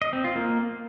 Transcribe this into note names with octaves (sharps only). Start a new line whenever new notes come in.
D#5
C4
F4
A#3